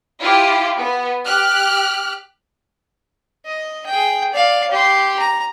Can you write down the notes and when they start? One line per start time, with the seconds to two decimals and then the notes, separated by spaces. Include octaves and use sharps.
0.20 E4 F4 G4
0.78 B3
1.26 G4 F6 F#6
3.45 D#5
3.86 G#4 G5
4.33 D5 F5
4.71 G4 C6
5.19 A#5